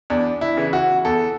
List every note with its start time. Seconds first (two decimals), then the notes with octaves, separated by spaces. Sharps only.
0.10 E2 D4
0.41 E4
0.57 C#3 E3
0.73 F#4
1.05 E2 A4